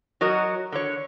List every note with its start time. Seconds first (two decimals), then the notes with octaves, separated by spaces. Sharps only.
0.21 F#3 F#4 A#4 D#5
0.72 D3 C#5